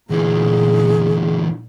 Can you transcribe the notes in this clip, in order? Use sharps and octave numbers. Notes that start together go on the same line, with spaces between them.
D2 A#2 E3 G#4